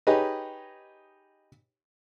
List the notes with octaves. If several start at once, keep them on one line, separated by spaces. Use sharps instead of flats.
D#4 G4 G#4 B4 C#5 D#5